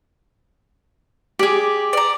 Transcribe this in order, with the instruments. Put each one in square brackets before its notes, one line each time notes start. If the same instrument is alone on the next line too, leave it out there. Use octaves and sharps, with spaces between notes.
[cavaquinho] G4 G#4 [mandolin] D5
[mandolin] D5 A#5 [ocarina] D6